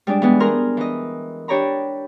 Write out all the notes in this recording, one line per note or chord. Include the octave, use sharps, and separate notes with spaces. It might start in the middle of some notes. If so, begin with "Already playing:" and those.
G3 G#3 D4 D5
E3 G#3 B3
G#4 A#4 A#5 C6 F6
E3 D#5
D4 G4 C#5 D5 A#5 B5